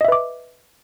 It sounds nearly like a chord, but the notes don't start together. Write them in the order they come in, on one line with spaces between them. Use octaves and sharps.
D#5 E5 B4 D6